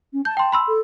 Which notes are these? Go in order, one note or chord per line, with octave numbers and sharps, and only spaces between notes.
C#4
A5 G6
G5 A5 C6
B5 C6 E6
A4